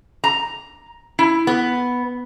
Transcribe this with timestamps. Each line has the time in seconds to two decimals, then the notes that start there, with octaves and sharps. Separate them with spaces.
0.24 A#5
1.19 E4
1.47 B3